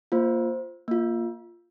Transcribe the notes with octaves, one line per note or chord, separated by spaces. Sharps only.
A#3 F4 C5
A#3 F4